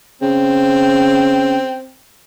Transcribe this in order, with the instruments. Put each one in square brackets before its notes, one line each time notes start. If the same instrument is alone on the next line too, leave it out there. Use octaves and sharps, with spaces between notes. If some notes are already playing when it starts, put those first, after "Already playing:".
[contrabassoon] C#3 [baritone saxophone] C4